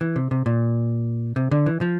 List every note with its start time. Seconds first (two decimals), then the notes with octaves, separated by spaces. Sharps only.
0.01 E3
0.16 C3
0.31 C3
0.46 A#2
1.36 C3
1.51 D3
1.66 E3
1.81 F3